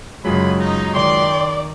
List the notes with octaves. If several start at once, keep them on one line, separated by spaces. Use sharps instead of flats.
F#2 C#3 F#3 G#3 F4 G4 G#4 B5
D#4
D#3 D5 G5 C6